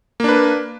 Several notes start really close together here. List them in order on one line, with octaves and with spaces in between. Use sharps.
A#3 D4 B4